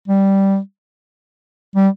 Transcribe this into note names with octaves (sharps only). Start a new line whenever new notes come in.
G3
G3